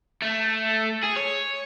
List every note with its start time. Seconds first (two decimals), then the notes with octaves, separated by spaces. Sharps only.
0.22 A3
1.04 G#4
1.17 C#5